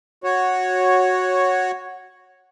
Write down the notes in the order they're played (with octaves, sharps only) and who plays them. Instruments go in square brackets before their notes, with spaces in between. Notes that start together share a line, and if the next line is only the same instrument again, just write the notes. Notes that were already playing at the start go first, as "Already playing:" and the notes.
[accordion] F#4 C#5